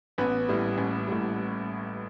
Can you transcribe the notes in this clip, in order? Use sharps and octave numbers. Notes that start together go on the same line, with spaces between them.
A1 B3 B4
A2 G3
A1
A2 G3